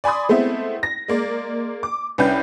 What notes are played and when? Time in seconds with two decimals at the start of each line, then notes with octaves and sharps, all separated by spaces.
0.04 D5 G#5 B5 C6 D#6
0.29 G#3 A3 B3 C4 E4
0.83 A#6
1.08 G#3 A#3 D5
1.83 D6
2.18 C2 C#4 D4 B4 G5 G6